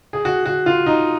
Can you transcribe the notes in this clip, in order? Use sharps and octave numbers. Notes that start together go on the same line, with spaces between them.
G#4
F#4
F#4
F4
D#4